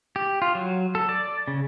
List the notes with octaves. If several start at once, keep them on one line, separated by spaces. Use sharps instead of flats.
G4
F4
F#3
A4
D5
C#3